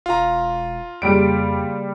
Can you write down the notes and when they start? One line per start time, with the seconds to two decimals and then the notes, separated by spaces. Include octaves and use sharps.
0.06 E1 F4 A#5
1.02 F2 C#3 G3 A#3 G#4 D7